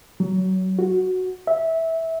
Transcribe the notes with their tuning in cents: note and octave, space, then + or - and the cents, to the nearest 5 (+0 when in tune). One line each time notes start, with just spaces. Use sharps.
F#3 +20
F#4 +0
E5 -15